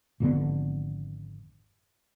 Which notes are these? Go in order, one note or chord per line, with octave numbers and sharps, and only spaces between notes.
G#1 F2 D3 B3